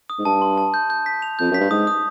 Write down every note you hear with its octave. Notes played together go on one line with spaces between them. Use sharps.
D#6
G#2
G2 A5
C6
A5
G6
G6
B6
F7
F2 G6
F#2 B6
G2
G#2 D#6
D#6